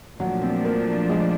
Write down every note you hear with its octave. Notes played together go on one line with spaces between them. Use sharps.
A#2 F3 F#3 A3 D4
C4
A#3
G#3